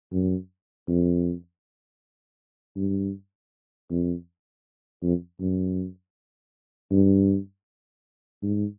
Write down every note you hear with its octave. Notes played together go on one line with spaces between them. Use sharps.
F#2
F2
G2
F2
F2
F#2
G2
G#2